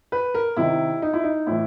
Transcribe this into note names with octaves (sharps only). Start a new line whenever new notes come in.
B4
A#4
C3 D#3 E4
D#4
E4
D#4
A2 E3 E4